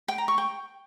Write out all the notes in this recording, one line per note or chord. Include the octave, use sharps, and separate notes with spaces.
G5
A#5
C#6
G5